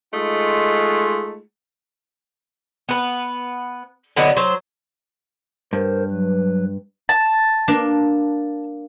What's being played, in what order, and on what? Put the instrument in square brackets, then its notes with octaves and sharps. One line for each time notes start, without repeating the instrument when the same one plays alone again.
[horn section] G#3 A3 D#4 F4
[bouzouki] B3 B4
D3 F#3 B3 D#4
F#3 C5
[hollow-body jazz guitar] G2 [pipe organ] A#4 C5
[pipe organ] F#3 B4
[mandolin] A5
[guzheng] A#3 D4